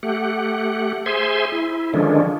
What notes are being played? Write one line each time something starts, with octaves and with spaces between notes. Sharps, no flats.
A3 G4 F#5
G#4 C5 E5 G#5 C6
E4
D3 D#3 F3 G#3 C#4 D4